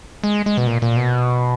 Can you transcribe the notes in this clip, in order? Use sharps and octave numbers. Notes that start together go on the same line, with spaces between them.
G#3
G#3
B2
A#2
A#2
B2